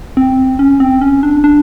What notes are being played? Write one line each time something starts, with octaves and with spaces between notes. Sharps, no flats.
C4
C#4
C4
C#4
D4
D4